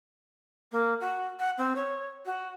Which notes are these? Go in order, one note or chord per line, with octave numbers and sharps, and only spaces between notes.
A#3
F#4
F#5
C4
C#5
F#4